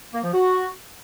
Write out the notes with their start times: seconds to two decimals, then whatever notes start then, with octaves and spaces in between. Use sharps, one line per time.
0.14 A#3
0.23 F3
0.33 F#4